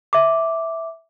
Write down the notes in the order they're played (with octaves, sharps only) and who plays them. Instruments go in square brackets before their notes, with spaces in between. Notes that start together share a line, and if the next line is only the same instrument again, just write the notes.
[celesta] E5 D6